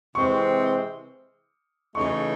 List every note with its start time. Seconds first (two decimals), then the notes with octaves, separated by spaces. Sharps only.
0.15 C3 E3 G#3 C4 C#6
1.95 C#3 E3 A3 D#4 C#6